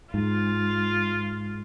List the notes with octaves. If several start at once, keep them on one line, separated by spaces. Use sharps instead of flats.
G#2 F4